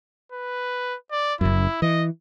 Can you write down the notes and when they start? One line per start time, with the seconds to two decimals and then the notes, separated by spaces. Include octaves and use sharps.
0.32 B4
1.11 D5
1.41 F#1 F#2 E4
1.82 E3 D#5